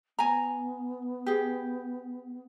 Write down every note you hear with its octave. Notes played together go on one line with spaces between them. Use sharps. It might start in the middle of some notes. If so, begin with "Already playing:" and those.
B3 G#5 A#5
G4 G#4